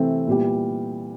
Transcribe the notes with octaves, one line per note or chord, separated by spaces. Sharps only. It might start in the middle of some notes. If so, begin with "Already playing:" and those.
Already playing: C3 E3 A3 C4
A#2 G3 B3 E4 G4